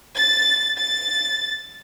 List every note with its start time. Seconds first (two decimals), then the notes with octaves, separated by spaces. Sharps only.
0.16 A6
0.78 A6